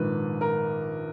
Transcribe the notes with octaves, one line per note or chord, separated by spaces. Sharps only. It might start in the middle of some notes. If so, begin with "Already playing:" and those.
Already playing: A#1 G#2 D#3 B4
A#4